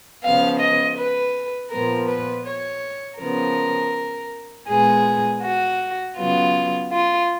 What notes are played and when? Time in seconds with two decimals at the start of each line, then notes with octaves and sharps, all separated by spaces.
0.23 C#3 F3 B3 F5
0.60 D#5
0.97 B4
1.71 A#2 F3 B3 A#4
2.08 B4
2.46 C#5
3.20 C#3 F3 B3 A#4
4.69 A#2 G#3 B3 G#4
5.43 F#4
6.17 C#3 F#3 B3 F4
6.92 F4